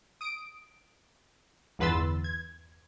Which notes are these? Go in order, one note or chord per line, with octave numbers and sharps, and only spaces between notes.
D#6 D7
G1 E2 B4 C6 E6 A6
G#6